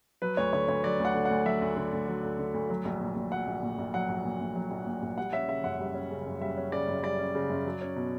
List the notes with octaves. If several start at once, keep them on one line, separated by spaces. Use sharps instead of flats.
F#3 B4
D2 C#5
D3 C#5
D2 C#5
F#3 D5
D2
F#5
D3
D2 F#5
F#3 E5
D2
D3
D2
F#3
D2
D3
D2
F#3
A#1
A#2
A#1
F#3 F#5
A#1
A#2
A#1
F#3 F#5
A#1
A#2
A#1
F#3
A#1
A#2
A#1
G3 F#5
C#4 E5
C#3 E5
F#2 F#5
G3
C#4
C#3
F#2
G3 E5
C#4
C#3 D5
F#2
G3 D5
C#4
C#3
F#2
F#3
C#4
B2